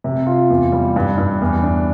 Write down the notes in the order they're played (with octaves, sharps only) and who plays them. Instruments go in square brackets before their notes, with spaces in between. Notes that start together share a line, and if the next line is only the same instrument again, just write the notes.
[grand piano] C3
F4
E2
G3
G2
G2
E2
D4